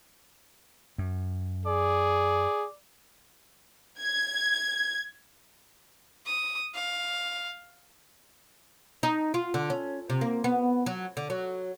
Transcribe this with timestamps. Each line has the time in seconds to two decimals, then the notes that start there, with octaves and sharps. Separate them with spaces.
0.98 F#2
1.66 G#4 D5
4.00 G#6
6.26 D#6
6.74 F5
9.03 D#4
9.34 F4
9.54 D3
9.70 C#4
10.10 C3
10.21 A#3
10.44 B3
10.86 F#3
11.17 D3
11.30 F#3